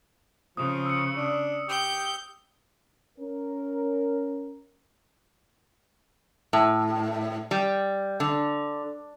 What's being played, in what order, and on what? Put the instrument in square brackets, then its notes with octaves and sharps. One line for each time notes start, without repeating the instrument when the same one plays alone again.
[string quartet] C#3 [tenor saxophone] F3 [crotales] D#6
[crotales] E6 C#7
[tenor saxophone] D4
[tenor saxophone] G4 [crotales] D#6 [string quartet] G6
[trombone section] C#4 A#4
[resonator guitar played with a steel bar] A2
G3
D3